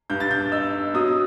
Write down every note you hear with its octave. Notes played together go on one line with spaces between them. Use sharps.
G2 G6
A6
G6
D#4 E6
F#3 D#6